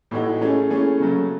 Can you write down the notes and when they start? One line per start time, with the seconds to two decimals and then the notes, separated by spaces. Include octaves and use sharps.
0.11 A2 E3 A3 D#4 F#4
0.41 E3 A3 C#4 G#4
0.70 E3 A3 C#4 G#4
1.00 C#3 F#3 A3